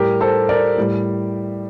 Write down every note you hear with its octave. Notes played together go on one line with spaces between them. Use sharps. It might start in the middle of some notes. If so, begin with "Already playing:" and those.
Already playing: A2 G3 G4 A#4
A4 C5
A#4 D5
A2 G3